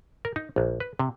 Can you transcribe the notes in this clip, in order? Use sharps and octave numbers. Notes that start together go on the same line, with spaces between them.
A#4
D#4
A#1
B4
C3